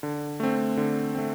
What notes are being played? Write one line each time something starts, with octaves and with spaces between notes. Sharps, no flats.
D3
A3 C4
D3
A3 C4